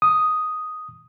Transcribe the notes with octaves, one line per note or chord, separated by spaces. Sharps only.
D#6